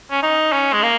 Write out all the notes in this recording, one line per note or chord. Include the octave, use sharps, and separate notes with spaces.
C#4
D#4
C#4
G#3
A#3